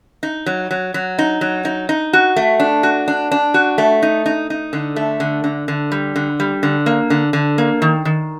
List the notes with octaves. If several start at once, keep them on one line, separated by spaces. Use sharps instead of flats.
D#4
F#3
F#3
F#3
D#4
F#3
D#4
D#4
F#4
A3
D4
F#4
D4
D4
F#4
A3
D#4
D#4
D#4
D3
A3
D3
D3
D3
G3
D3
G3
D3
A#3
D3
D3
A#3
D#3
D#3